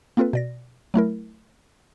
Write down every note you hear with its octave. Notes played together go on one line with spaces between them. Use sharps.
A#3 C4 F4 A4 B4
B2 D5 A#6
F#3 A3 E4 A#4